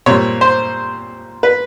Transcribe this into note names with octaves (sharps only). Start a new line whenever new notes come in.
A#2 G3 C4 C#5
C5
B4